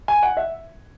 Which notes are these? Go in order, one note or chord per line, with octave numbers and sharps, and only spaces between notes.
G#5
F#5
E5